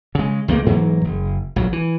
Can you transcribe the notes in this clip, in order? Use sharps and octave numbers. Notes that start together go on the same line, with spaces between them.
C#3 G#3
C#2 F3 A3 A#3
G#2 E3 F#3 A#3
F#1
A#1 F#3
E3